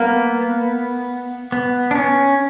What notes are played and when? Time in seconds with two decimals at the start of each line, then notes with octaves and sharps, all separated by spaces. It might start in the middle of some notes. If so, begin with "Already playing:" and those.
Already playing: A#3 B3
1.52 B3
1.91 D4
1.95 C#4